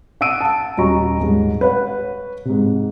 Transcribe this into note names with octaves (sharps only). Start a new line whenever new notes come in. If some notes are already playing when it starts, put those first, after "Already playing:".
F#5 D#6 E6 D7 D#7
A5
D#1 C#4 F#4 D#5 A#5 C#6
D#1 G#2
B4 C#5 F#5
G#2 C3